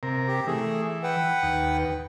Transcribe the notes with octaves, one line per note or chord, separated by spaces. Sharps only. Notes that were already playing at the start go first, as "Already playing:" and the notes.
C3 A#4
G4
E3 A3 G#4
B4 F#5 G5
D#2